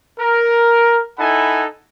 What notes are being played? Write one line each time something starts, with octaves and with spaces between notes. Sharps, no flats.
A#4
D#4 E4 A4 F#5 G#5 B5